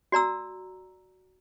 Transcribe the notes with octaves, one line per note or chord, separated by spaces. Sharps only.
F#4 D5 A#5 E6